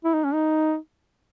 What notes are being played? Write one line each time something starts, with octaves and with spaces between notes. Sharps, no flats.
E4
D#4
C#4
D#4